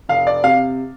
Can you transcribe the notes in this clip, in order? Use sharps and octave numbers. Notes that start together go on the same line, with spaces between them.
F1 F5
D5
C3 F5